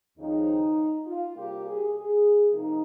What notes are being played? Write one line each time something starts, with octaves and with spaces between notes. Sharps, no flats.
D#2 C#3 F3 G#3 C4 D#4
F4
C3 G3 A#3 G4
G#4
G#4
C3 F3 A#3 D#4